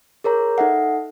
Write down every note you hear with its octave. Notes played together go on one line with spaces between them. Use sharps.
G#4 A#4 C#5 A#5
D#4 A4 E5 F#5